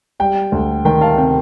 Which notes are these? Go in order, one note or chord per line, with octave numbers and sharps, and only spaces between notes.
G3 G5
D2
D#3 G5
F5 A5
C3 G5